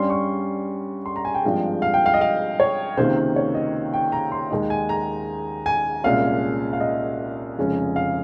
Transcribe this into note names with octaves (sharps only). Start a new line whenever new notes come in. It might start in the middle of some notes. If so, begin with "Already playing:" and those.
Already playing: G2 G3 C#4 C6
C#6
C6
A#5
G#5
G5
G#1 G2 F3 G#3
F5
G5
F5
D#5
F5
C#5
C#2 C3 D#3 A#3 C5
C#5
D#5
G5
A#5
C6
D#2 D#3 G#3 D#4
G#5
A#5
G#5
C2 A#2 G#3 C#4 F5
F5
D#5
F1 F2 C#3 G#3 C#4
F5